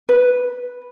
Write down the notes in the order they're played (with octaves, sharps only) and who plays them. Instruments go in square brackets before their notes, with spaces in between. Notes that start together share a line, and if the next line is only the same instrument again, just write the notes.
[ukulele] B4